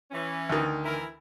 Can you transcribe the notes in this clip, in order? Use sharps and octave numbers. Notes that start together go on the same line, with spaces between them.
E3 C#4
D2 D#3
E3 E4 A#4